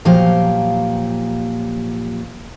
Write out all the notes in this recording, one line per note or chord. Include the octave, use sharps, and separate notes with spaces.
A#2 F3 F#3 G4 F5